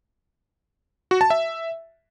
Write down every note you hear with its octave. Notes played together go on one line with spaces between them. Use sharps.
F#4
A5
E5